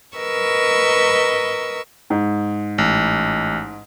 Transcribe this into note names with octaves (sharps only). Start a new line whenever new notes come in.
A#4 B4 D#5 C#6 E6
G#2
A1